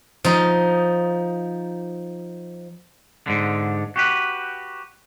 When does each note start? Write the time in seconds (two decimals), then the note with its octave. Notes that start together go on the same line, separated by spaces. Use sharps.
0.24 F3 D#4
3.27 G#2 D3
3.96 F#4 G4 B4